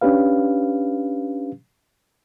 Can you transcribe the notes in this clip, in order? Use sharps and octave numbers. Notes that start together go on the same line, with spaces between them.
C#4 D4 G4 B4 F5